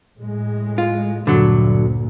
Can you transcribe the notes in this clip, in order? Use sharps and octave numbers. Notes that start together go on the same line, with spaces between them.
A2 G#3
F4
D2 G2 A#2 D3 F#3